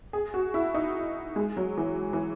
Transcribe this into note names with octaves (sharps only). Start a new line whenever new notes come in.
G#4
F#4
E4
D#4
G#3
F#3
E3
E3